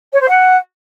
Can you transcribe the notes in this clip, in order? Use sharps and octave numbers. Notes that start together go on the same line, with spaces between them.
C#5
C5
F#5